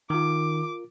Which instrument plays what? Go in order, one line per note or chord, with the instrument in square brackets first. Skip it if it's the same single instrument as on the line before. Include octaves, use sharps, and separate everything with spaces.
[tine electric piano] D#3 [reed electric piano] F4 A#4 [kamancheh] D6